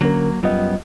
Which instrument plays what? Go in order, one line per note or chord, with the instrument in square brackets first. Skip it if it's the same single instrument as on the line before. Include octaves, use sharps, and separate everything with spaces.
[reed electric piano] D3 C#4 A#4 [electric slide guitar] F#3 A#3
[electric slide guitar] F#2 G3 B3 [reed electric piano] F4 D#5